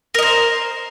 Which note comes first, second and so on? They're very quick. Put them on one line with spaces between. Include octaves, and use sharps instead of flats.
A#4 D#5 C5